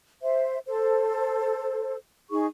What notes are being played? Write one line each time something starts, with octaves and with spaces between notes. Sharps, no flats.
C5 E5
A4 C5
D#4 G#4 C#6